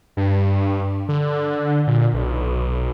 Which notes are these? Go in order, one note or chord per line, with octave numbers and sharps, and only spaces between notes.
G2
D3
A#2
B1